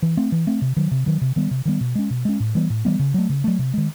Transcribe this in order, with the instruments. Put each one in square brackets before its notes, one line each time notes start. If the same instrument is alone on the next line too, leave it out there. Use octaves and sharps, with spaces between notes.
[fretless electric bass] E3
A3 C4
E3
A3 C4
C3
D#3 F#3
C3
D#3 F#3
C3
D#3 G3 B3
C3
D#3 G3 B3
B2
G#3 C#4
B2
G#3 C#4
A2
E3 G3 B3
A2
E3 G3 B3
C#3
F#3 A3
C#3
F#3 A3
C3
D#3 G#3